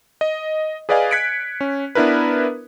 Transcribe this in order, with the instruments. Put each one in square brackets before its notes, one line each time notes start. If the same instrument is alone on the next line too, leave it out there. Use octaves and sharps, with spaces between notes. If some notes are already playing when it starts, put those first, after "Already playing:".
[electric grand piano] D#5
G#4 B4 D5 D#5 F5 G#5
F#6 G#6 B6 C#7 D7
C#4
B3 D4 E4 A#4 B4